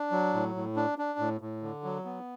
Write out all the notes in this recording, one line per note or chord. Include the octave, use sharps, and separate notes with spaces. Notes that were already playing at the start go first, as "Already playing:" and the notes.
Already playing: D4
F#3
A2
A2
D4
D4
A2
A2
D3
F#3
B3